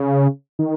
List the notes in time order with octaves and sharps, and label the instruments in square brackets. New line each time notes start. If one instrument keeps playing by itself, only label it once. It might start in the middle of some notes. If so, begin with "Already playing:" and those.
Already playing: [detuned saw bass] C#3
D#3